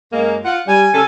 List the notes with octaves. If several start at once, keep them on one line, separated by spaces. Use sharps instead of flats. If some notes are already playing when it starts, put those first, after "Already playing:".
F#2 G#3 A#3
F4 F#5
G3 G#5
C#3 G4 A4